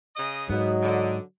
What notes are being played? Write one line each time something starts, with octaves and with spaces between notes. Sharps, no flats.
C#3 D#5
G#2 B2 F#3 A#3 B3 D#5
D3